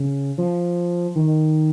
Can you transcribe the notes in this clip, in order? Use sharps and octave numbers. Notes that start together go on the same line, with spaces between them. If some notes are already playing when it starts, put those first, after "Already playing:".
Already playing: C#3
F3
D#3